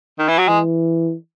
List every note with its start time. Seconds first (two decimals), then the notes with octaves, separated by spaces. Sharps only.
0.19 D#3
0.28 E3
0.39 F#3
0.48 E3 G#3